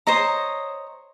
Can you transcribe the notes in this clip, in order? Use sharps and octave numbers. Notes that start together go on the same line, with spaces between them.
C5 C#5 D#5 A#5